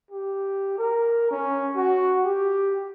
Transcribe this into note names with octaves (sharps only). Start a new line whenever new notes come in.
G4
A#4
C#4
F#4
G4